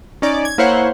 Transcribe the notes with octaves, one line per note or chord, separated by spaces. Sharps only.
C#4 D#4 D5
G#6
A#3 E4 C5 C#5 F#5